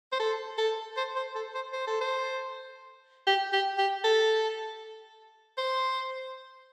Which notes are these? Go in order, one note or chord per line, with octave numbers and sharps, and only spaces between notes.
C5
A4
A4
C5
C5
A4
C5
C5
A4
C5
G4
G4
G4
A4
C5